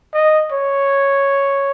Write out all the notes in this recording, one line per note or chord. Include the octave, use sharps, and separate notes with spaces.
D#5
C#5